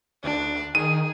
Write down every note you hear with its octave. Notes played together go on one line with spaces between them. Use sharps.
D2 D4
D#3 G#4 D#7